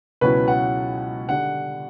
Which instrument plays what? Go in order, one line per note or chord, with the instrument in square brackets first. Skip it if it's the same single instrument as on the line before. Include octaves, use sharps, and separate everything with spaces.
[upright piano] C#2 B2 F#3 C#4 E4 [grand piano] B4
[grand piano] F#5
[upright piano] D3 G3 D4 [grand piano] F#5